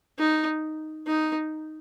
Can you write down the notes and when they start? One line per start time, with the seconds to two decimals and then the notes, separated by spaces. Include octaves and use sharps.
0.19 D#4
1.07 D#4